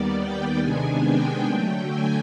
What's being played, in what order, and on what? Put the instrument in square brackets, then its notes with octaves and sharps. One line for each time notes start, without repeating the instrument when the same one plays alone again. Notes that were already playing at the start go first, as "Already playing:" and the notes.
Already playing: [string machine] D#2 D#3 G3 B3 D5
G5
C3 D#3 G#3 B3 D4 G#5
G5
D3 F#3 A3
G#5